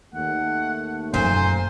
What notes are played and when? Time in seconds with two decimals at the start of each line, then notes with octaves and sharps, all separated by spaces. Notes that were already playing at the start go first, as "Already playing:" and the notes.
0.14 D#2 A3 F#5
1.14 F#2 A#2 C5 G#5